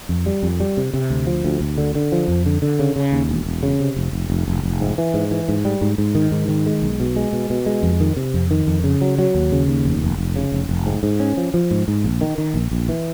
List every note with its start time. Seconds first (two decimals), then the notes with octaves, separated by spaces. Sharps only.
0.09 F2
0.26 G3
0.43 F2
0.60 G3
0.77 C3
0.94 C3
1.10 D2
1.27 F3
1.44 D2
1.60 D2
1.78 D3
1.95 D3
2.12 F3
2.28 F2
2.46 D3
2.62 D3
2.79 C#3
2.96 C#3
3.12 D#2
3.29 E1
3.46 E1
3.63 C#3
3.80 C3
3.96 F1
4.13 F1
4.30 F1
4.48 F1
4.63 F1
4.81 G#2
4.98 E3
5.14 G#2
5.31 E3
5.49 G#2
5.65 G3
5.81 G#2
5.98 G#2
6.15 D#3
6.31 G#2
6.48 D#3
6.66 G#3
6.82 B1
7.00 B2
7.16 G#3
7.33 B2
7.50 B2
7.66 G#3
7.83 F2
8.00 D#3
8.17 C3
8.34 F2
8.51 D#3
8.67 F2
8.84 C#3
9.01 F#3
9.19 F#3
9.34 D#2
9.52 C#3
9.68 D#2
9.85 F1
10.02 F1
10.18 F1
10.36 C#3
10.52 F1
10.69 F1
10.86 G#2
11.03 G#2
11.20 C#4
11.37 F3
11.54 F3
11.71 G#2
11.88 G#2
12.04 A#1
12.21 D#3
12.38 D#3
12.54 A#1
12.71 A#1
12.89 E3